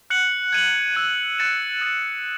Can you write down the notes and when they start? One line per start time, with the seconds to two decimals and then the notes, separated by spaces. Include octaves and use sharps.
0.10 F#6 C#7 F#7
0.53 G#6 D#7 F#7
0.96 E6 G#6 D#7
1.38 F#6 A6 C#7 E7
1.81 D#6 A6 E7